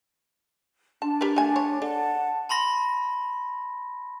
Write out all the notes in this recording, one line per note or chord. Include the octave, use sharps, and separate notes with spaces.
D4 A5
G4 A#4 B4
A3 G#5
C#5
D4 A4 F#5 A5
A5 B5 C6 A#6